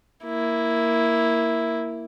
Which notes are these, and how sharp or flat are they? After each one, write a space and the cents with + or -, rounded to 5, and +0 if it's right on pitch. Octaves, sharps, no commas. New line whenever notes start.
A#3 +0 E4 +0